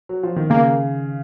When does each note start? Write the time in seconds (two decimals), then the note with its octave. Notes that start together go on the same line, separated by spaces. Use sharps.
0.09 F#3
0.23 F3
0.36 D#3
0.50 C#3 A#3